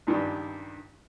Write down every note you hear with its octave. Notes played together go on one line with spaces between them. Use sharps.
C#2 G2 D#3 G3